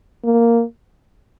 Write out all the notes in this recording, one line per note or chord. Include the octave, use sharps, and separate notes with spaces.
A#3